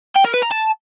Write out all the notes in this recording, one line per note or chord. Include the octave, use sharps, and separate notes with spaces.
G5
A#4
B4
A#5
A5